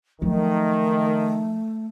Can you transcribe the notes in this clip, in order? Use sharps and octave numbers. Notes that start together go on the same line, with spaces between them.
D#3 F3 F#3 A3